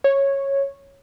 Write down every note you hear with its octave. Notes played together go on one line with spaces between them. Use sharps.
C#5